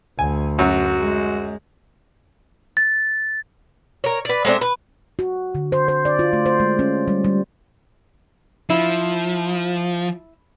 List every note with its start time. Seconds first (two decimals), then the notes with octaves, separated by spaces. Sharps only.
0.19 D2 G#5
0.59 F#2 F#4
0.99 G#3
2.77 A6
4.04 A#4 C#5
4.25 B4 D5
4.45 G#3 A3 C4 D4
4.61 B4
5.19 F#4
5.55 D3
5.72 C5
5.88 C5
6.05 D5
6.19 F4
6.33 A3
6.46 C5
6.60 G#3
6.79 C#4
7.08 G3
7.24 G3
8.70 F3 E4